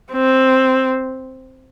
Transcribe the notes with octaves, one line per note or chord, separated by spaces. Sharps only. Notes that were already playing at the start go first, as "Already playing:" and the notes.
C4